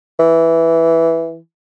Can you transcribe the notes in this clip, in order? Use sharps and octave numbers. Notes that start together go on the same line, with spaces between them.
E3